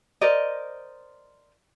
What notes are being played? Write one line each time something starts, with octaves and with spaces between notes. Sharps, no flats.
A#4 C5 D5 D#5